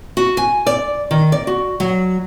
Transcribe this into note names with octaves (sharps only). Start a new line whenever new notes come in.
F#4
G#5
D5
D#3
D5
F#4
F#3